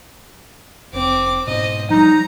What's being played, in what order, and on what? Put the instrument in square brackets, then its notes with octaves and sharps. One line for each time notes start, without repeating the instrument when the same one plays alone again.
[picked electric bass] F1 [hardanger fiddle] C4 D6
[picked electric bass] G#2 B2 [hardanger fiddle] C5 D#5
[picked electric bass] F3 G3 [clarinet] D#4 [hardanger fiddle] A#5